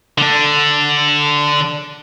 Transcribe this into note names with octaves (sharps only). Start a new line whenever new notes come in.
D3 D4